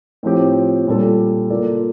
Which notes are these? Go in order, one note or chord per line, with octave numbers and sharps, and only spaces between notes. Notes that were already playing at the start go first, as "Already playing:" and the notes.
A2 F3 C4 G4
A#2 G3 D4 A4
A#3 F4 A4 D5